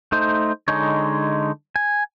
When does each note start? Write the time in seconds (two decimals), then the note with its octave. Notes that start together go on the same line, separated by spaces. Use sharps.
0.12 A3 D#4 C5
0.68 D3 G#3 D#4 C#5
1.76 G#5